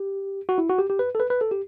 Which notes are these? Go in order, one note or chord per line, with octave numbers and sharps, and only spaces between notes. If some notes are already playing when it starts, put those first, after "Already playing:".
Already playing: G4
F#4
E4
F#4
G4
G4
B4
A4
B4
B4
A4
G4